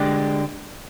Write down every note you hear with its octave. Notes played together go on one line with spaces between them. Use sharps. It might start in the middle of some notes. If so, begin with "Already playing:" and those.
Already playing: D3 G#3 D4 G4